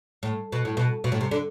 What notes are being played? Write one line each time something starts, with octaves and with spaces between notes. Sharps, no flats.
A2
B2
A2
B2
B2
A2
C3
D3